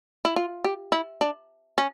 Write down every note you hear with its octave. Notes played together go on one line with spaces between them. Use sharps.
E4
F4
G4
E4
D4
C#4